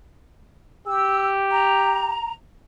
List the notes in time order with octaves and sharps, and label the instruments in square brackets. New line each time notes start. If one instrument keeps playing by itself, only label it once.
[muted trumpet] G4 [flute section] E6
[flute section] A#5